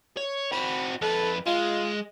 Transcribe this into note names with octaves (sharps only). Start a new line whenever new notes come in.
C#5
C4 F#4 B5
F2 A4 B4
G#3 F4